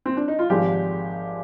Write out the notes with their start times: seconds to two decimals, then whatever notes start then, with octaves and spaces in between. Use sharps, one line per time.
0.06 C4
0.17 D4
0.28 D#4
0.39 F4
0.50 G#1 G#2 F3 G#3 G4